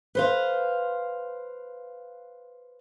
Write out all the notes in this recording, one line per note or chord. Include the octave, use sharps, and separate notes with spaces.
B4 C5 F5